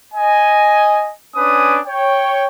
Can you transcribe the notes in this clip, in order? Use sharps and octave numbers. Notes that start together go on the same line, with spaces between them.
D#5 G#5
C#4 D4 B4 G#5 D6 D#6
C#5 G5